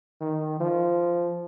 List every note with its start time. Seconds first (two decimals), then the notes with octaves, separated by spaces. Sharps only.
0.21 D#3
0.60 F3